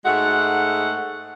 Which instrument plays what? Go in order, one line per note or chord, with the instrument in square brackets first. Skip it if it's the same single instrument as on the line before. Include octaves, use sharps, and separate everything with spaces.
[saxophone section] G#2 G#3 A3 F#5